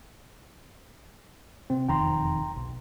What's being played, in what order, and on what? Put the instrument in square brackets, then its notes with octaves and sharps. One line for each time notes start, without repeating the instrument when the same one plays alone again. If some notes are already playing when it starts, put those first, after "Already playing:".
[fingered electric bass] C3 [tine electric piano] C4
[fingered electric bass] E1 F2 D#3 [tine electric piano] G5 A#5 C6
[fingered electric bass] B1